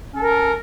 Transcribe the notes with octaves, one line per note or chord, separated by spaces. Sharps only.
C#4 A4 A#4